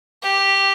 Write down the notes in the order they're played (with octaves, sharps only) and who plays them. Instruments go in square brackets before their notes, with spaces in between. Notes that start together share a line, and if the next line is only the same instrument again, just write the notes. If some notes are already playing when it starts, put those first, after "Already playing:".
[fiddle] G4